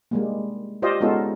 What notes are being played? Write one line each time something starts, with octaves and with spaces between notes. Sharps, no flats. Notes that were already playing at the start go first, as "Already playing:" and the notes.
G3 G#3 A#3
F4 G4 C5 D5 D#5 F5
G#3 B3 C#4 D#4 F4 A4